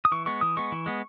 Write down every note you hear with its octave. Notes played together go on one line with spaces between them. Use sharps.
D#6
E3 C#6
G#3 B3 C#6
E3 D#6
G#3 B3 C#6
E3
G#3 B3